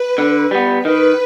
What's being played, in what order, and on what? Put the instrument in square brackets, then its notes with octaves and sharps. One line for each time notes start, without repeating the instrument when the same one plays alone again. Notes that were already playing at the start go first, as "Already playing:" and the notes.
Already playing: [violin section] B4
[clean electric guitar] D3
G3 B3
[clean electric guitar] D#3 [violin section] B4